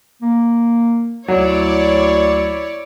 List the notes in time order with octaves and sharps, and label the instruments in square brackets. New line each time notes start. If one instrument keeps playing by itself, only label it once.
[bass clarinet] A#3
[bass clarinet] D2 [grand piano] F#3 [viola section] E4 C#5 D5